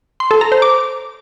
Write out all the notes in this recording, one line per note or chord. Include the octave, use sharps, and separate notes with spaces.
C6
A4
A#5
C5
D6